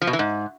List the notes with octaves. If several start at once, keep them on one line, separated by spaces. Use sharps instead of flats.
F3
B2
E3
G#2